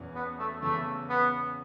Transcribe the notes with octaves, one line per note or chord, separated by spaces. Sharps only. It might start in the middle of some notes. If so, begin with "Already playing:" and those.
Already playing: E1 E2 E3 C#4
B3
A3
E2 C#3 E3 A3 C#4
B3